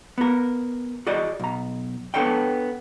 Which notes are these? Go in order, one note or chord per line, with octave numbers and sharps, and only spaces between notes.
B3 A#4
F#4 G#4 D5 D#5
B1 A#5
B3 D4 A4 C#5 D#5 G5